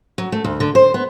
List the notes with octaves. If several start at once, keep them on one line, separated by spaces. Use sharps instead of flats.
F#3
A3
D2
D3
C5
B3